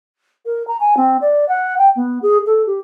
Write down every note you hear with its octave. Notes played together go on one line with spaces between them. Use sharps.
A#4
A#5
G#5
C4
D5
F#5
G5
B3
G#4
A4
G4